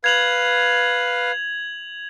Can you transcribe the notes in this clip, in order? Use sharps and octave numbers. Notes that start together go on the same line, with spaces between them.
B4 F5 G#6 F7 F#7